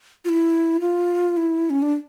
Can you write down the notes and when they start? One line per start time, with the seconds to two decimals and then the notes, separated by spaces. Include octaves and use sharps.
0.25 F4
0.29 E4
0.80 F4
1.37 E4
1.70 C#4
1.82 D4